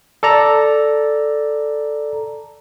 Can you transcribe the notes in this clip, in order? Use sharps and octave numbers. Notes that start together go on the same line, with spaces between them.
A4 D5 A#5